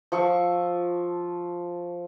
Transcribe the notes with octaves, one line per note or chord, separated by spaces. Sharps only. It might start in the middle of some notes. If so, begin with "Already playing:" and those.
F3 C#6 E6